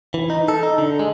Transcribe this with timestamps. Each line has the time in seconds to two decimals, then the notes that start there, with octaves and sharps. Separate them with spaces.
0.14 E3
0.30 D#4
0.48 A4
0.63 D#4
0.78 D3
0.99 G#3